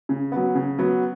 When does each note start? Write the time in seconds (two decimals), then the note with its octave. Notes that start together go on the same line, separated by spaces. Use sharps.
0.09 C#3
0.32 F#3 B3
0.55 C#3
0.79 F#3 B3